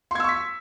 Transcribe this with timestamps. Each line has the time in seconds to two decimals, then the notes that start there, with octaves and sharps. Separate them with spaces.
0.11 C6
0.15 G#6
0.20 E6
0.24 C#6
0.29 B6